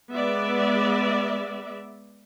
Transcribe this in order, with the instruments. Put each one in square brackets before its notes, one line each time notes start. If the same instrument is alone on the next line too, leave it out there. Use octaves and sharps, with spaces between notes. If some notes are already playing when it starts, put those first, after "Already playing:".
[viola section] G#3 B3 D5 E5